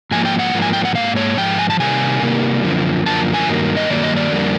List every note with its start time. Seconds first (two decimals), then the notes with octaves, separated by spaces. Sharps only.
0.11 G#2 F3 A#3 G#5
0.25 G5
0.39 F#5
0.53 G#2 F3 A#3
0.62 G#5
0.73 G5
0.85 F#5
0.95 G#2 F3 A#3 F5
1.16 C#5
1.37 G#2 F3 G5
1.59 G#5
1.70 A5
1.79 C3 D#3 G3 A#3 G#5
2.22 C3 D#3 G3 A#3
2.63 F#2 D3 F3 A#3
3.06 F#2 D3 F3 A#3 A5
3.34 G#5
3.48 G2 D#3 F#3 A#3
3.77 D#5
3.90 G2 D#3 F#3 A#3 D5
4.03 D#5
4.16 D5
4.32 F2 D3 G3 A#3